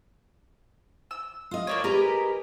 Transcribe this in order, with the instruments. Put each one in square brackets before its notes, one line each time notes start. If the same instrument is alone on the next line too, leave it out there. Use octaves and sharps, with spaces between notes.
[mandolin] E6
[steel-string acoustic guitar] F4 D#5
[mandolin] A#3 D4 C#5
[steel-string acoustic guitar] G4 G#4 B4 [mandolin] A#4 D#5 A#5